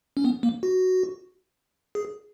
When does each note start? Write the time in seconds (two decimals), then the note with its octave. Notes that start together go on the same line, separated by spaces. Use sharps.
0.17 C#4
0.25 B3
0.43 A#3
0.63 F#4
1.95 G#4